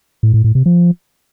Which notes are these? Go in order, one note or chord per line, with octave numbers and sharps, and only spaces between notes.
A2
A2
A2
C3
F3